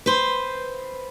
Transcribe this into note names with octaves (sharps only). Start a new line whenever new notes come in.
B4 C5